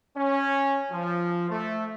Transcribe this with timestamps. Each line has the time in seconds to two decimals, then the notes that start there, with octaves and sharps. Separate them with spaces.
0.17 C#4
0.92 F3
1.50 A3